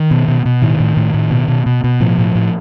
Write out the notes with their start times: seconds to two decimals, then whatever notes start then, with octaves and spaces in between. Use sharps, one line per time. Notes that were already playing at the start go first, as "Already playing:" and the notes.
Already playing: D#3
0.11 B2
0.28 B2
0.45 B2
0.62 A2 D#3
0.80 A2
0.97 A2
1.14 A2
1.31 B2
1.48 B2
1.66 B2
1.84 B2
2.00 A2 F3
2.18 A2
2.35 A2